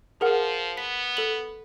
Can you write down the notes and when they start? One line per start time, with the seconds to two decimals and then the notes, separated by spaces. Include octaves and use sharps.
0.21 F3 G#4 A#4 F#5
0.78 B3 B6
1.17 A4 F#7